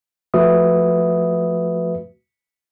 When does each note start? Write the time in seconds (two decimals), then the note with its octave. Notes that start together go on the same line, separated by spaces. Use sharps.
0.34 F3 A3 F#4 B4 E5 D#6